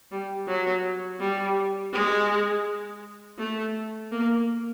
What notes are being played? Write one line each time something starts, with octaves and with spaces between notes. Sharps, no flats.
G3
F#3
G3
G#3
A3
A#3